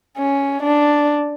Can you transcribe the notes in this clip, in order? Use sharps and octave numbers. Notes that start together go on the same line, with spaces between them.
C#4
D4